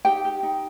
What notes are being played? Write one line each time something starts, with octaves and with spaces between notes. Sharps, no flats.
D#4 G4 G5
G4
D#4